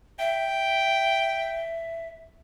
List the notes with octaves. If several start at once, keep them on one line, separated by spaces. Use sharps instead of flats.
E5 G5